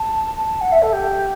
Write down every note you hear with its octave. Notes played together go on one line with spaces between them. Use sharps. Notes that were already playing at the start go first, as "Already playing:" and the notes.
Already playing: A5
F#5
E5
A4
G4